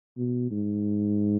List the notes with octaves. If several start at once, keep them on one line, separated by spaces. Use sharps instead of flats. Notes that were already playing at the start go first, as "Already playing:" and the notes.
B2
G#2